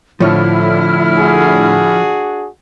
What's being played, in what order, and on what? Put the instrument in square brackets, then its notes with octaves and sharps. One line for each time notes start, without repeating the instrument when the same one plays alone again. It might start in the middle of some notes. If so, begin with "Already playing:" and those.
[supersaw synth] A2 D3 [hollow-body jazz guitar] F3 C#5 [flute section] E4 F6
[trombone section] D4 F#4 G#4